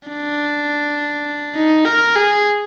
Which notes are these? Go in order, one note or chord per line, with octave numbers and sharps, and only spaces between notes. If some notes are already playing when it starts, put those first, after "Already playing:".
D4
D#4
A#4
G#4